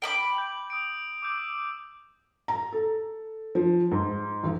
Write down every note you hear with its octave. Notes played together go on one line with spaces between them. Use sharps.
G5 B5 D6
G6 F#7
D#6 D7
D6 E6 G6
A#5
A4
F3
G#2
A1